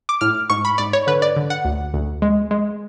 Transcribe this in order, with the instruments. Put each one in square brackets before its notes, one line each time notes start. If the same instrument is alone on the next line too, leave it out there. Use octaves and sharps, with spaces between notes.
[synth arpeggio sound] D6
A2 F6
G#2 C#6
B5
G#2 D5
C#5
D3 B4
D5
D3
F#5
D2
D2
G#3
G#3